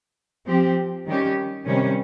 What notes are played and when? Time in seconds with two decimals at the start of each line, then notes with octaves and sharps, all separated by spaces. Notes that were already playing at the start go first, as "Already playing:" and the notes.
0.47 F3 C4 G4
1.07 D#3 G3 C#4 G4
1.66 C3 D#3 G3 C#4